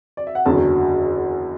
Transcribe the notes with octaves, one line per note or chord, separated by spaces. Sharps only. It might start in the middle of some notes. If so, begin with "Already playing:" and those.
D5
E5
F#5
F#1 E2 D3 F#3 A5